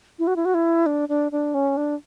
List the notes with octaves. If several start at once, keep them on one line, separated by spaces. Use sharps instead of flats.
E4
F#4
E4
F#4
E4
D4
D4
D4
C#4
D4